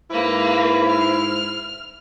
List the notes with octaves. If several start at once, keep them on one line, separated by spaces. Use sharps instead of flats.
G#2 A#3 E4 B4 C5
F6